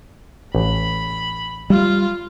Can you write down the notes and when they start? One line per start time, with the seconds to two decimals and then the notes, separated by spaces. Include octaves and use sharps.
0.55 A1 B5
1.70 G3 F4